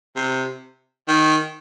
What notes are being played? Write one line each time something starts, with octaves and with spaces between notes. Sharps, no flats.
C3
D#3